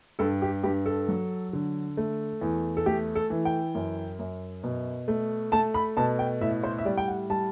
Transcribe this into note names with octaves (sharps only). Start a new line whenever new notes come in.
G2 A4
G4
G2 G4
A4
F#3
D3
A3
E2
A4
A3 G4
A4
E3
G5
F#2
F#2
B2
A3
A3 A5
B5
B2 A5
G5
A2 E5
C5
E5
G3 D5
G5
F#5
G3 A5